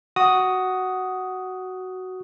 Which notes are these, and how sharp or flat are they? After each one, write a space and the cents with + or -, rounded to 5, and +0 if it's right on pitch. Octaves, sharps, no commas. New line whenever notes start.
F#4 +5 D#6 +0